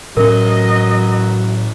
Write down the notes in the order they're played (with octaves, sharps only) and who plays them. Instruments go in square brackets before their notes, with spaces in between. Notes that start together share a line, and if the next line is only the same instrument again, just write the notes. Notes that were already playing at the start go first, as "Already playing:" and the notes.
[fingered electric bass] A2 C#4 [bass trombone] F#3 [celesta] A#4 [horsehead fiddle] D#5